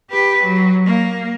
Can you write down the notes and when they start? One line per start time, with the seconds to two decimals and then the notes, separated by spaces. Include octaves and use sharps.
0.11 G4 B4
0.44 F#3
0.86 A#3